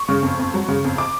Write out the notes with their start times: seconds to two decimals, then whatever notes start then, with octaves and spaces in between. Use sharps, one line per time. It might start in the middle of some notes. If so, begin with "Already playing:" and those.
Already playing: C#6
0.09 C#3
0.23 F2
0.39 F2
0.54 F#3
0.68 C#3
0.84 F2
0.98 D6